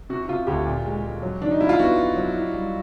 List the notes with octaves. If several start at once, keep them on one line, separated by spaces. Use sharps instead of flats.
C3 F#4
F#4
C3 F4
D2 G4
A#2
G#3
G#3
F#3
D#3 D4
D#4
C2 E4
F4
B3 F#4
F2
F#3
E4
G3